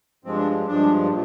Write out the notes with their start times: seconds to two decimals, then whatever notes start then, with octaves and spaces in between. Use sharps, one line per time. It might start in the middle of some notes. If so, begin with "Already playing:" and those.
0.25 G2 F3 G#3 C4
0.36 D4
0.48 C4
0.67 G2 F3 G#3 D4
1.10 A#2